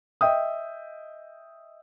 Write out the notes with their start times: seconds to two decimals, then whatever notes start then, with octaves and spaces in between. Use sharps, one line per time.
0.21 D#5 E5 G5 D#6